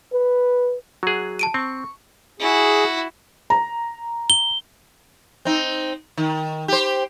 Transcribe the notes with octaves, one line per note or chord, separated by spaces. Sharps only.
B4
F#3 F#4 G#4
A5 D7 D#7
C4 C#6
E4 F#4 G#4
A#5
G7
C4 D#4
D#3
G4 C5